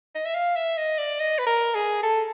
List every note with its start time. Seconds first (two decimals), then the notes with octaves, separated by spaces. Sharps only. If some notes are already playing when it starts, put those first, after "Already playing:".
0.15 D#5
0.25 E5
0.35 F5
0.56 E5
0.77 D#5
0.98 D5
1.20 D#5
1.39 B4
1.46 A#4
1.75 G#4
2.03 A4